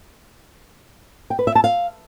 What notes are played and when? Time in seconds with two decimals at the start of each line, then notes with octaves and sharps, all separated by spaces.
1.30 G5
1.39 B4
1.47 E5
1.55 A5
1.64 F5